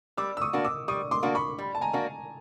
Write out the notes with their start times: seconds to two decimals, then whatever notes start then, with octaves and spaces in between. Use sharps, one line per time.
0.17 G3 D6 E6
0.37 E6
0.42 C#6 D#6
0.53 A#3 D4 F#4
0.64 D6 E6
0.88 G3 C#6 D#6
1.11 C6 D6
1.23 A#3 D4 F#4
1.35 B5 C#6
1.58 G3
1.75 A5
1.81 G#5 A#5
1.93 A#3 D4 F#4